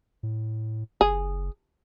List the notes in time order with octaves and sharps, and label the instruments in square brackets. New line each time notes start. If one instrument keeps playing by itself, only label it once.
[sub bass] A2
[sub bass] F#1 [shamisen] G#4